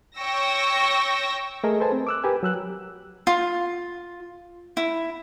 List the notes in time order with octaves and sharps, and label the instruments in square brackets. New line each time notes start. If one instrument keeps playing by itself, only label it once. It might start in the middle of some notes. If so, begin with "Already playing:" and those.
[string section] C#5 G5 C#6 E6 A#6
[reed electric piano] A3 G#4 A#4 D#5
A4 B4 C5 G#5 A5
C4
D6 E6 F#6
G4 A#4 B4 G#5
F#3 E6 F#6
[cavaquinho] F4
E4